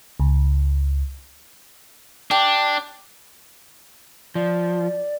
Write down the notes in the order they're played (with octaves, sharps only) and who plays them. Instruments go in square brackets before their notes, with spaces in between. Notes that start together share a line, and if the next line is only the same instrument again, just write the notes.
[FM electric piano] C#2
[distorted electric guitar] D4 [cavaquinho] G4
[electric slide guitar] F3 [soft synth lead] D5